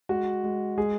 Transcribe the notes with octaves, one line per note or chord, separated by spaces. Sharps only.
G#3 F#4
G#3
G#3 G#4